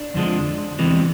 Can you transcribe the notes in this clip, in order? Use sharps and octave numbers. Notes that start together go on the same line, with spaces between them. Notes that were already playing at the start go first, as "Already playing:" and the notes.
Already playing: D4
F2 D3 F3 G#3
E2 C3 E3 G#3